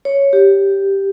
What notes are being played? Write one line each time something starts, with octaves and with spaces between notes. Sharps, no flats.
C#5
G4